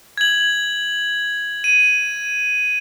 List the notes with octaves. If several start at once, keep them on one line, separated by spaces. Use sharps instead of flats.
G#6 F#7
D#7